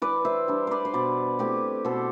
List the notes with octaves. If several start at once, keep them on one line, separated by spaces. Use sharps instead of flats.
E3 B4 D5
C5 E5
G3 D4
B4 C5 D5
C5
B2 B4 D5
A3 C4 E4 G4 B4
B2 A4 C5